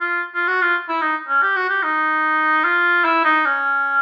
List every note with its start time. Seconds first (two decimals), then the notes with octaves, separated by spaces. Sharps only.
0.01 F4
0.35 F4
0.48 F#4
0.62 F4
0.89 E4
1.02 D#4
1.29 C#4
1.42 G4
1.56 F#4
1.70 G4
1.83 D#4
2.64 F4
3.05 E4
3.25 D#4
3.46 C#4